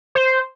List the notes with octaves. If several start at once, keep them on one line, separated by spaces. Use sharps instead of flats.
C5